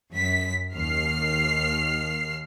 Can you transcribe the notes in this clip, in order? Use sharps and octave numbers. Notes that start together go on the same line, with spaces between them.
F#2 B6
D#2 F6 C7